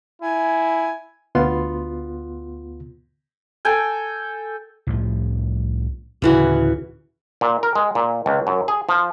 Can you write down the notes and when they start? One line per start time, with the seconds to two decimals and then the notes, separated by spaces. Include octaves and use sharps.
0.22 E4 G#5
1.35 D2 B3 F4 C6
3.65 A4 G5 G#5
4.87 C2 A2 F3
6.22 D1 C#3 E3 F#4
7.41 A#2
7.63 A#4
7.75 G#3
7.95 A#2
8.26 C#2
8.47 F#2
8.68 G#4
8.89 F3